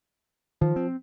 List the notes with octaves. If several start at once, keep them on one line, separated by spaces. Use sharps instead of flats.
D#3 F3
C4